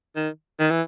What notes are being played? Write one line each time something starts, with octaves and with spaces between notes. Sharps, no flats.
D#3
D#3
E3